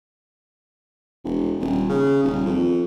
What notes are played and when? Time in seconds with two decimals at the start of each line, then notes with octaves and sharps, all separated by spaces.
1.24 E1
1.60 D#1
1.89 C#3
2.24 D#1
2.46 F2